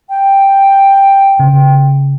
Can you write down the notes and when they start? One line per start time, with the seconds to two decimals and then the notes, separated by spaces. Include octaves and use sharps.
0.10 G5
1.39 C#3